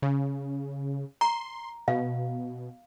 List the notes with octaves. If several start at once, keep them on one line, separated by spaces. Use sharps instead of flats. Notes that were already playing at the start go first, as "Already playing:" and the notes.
C#3
A#5 C6
B2 F5